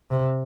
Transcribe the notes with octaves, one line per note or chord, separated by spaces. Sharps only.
C3